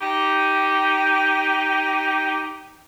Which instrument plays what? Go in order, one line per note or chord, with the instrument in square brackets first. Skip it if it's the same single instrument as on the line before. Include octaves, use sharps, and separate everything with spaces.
[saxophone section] D#4 G4